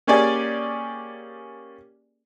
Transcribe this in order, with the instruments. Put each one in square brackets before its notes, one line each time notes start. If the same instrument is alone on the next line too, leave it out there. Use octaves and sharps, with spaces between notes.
[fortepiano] A#3 C#4 G4 G#4 D5 G#5